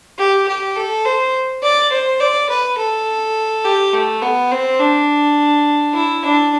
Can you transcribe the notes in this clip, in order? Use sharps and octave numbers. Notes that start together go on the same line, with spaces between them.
G4
G4
A4
C5
D5
C5
D5
B4
A4
G4
A3
B3
C4
D4
E4
D4